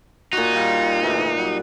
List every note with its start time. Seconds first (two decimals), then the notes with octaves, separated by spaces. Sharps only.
0.33 A#2 D#4 F#4
0.54 G3 F4
1.02 D2 G#2 E3
1.37 F#3 G3